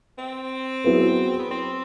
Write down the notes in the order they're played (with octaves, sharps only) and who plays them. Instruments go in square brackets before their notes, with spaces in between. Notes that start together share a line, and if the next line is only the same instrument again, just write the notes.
[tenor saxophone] C4
[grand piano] F#3 B3 E4 G#4 B4
[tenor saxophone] B3
C4